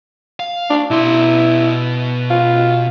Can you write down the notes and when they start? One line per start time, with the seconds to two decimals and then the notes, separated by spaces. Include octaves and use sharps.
0.40 F5
0.70 D4
0.91 B2 E4 C6
2.30 F4